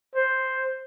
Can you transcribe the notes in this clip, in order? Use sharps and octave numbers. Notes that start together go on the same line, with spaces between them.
C5